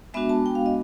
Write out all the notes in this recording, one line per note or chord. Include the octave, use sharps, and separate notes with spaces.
G#3 B3 D4 F#4 E5
A5
G5
F5
D#5